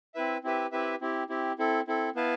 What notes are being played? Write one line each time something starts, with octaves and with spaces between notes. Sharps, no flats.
C4 E4 B4 E5
C4 E4 G4 B4 E5
C4 E4 G4 B4 E5
C4 E4 G4
C4 E4 G4
C4 E4 A4
C4 E4 A4
B3 E4 B4 F5 A5